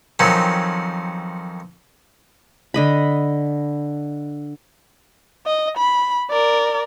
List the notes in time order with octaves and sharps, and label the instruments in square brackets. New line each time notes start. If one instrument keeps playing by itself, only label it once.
[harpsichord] F2 D#3 F#3 C4 C#4
[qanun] D3 D#5 B5
[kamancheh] D#5
B5
A#4 D5